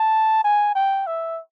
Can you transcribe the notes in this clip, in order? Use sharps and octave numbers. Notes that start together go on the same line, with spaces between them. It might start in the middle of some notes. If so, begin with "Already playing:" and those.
Already playing: A5
G#5
G5
E5